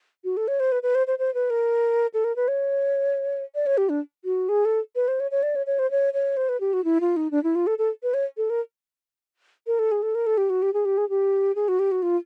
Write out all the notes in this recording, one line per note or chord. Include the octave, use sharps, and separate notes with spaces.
F#4
A4
C#5
C5
B4
B4
C5
C5
C5
B4
A#4
A4
A#4
B4
C#5
D5
C#5
G4
D4
F#4
G#4
A4
B4
C5
C#5
C#5
D5
C#5
C#5
C5
C#5
C#5
C5
B4
G4
F#4
E4
F4
D#4
D4
E4
F4
A4
A4
B4
C#5
A4
A#4
A#4
A4
G#4
A4
A#4
A4
G4
F#4
G4
G#4
G4
G#4
G4
G#4
F#4
G4
F#4
F4